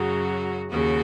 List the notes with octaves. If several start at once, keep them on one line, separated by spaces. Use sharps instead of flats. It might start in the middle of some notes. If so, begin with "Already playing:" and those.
Already playing: F#2 C#3 F#3 F#4
D#2 C#3 F#4